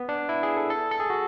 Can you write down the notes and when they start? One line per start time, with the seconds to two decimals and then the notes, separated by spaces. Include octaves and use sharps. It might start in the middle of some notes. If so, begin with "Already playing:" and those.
Already playing: B3
0.09 D4
0.29 E4
0.43 G#4
0.57 A4
0.70 A4
0.91 A4
1.00 G#4
1.10 F#4